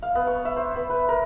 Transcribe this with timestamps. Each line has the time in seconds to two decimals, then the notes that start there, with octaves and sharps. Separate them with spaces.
0.02 F5
0.15 B3
0.27 C#6
0.45 E5
0.56 C5
0.76 B3
0.90 B4
1.09 A#4